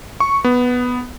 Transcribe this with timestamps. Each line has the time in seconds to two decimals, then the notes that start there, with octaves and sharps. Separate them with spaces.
0.20 C#6
0.44 B3